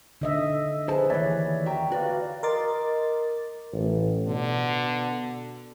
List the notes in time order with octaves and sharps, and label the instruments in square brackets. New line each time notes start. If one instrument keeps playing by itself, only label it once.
[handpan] D3 D#5 E5
[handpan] G#4 B4 [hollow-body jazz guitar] C5 A5
[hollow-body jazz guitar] D#2 E3 [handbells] C#5 D5 E5
[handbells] F#4 G5 A#5 [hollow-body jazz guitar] E5
[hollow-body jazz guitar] F#4 [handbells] B4 D5 F5
[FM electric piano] A#4 D#5 C6 D6 A6
[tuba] A1
[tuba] B2 [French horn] D3